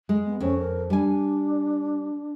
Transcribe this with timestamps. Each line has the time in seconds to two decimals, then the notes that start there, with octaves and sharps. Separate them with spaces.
0.09 G#3
0.26 B3
0.40 F2 C#4
0.59 A#4
0.90 G3 D4 G#5